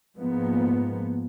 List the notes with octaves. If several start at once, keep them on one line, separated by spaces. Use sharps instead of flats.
G#2 F3 A#3 B3